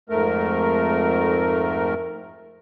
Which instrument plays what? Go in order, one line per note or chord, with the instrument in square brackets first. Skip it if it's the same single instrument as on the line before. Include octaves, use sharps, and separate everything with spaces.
[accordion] F2 G#2 A3 A#4